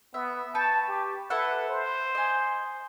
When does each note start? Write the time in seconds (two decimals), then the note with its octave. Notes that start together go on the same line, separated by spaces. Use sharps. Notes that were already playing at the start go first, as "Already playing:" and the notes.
0.14 B3 E5
0.55 B4 G5 A5 C#6
0.88 G4
1.30 E4 A4 B4 F#5
1.69 C5
2.15 D#5 G#5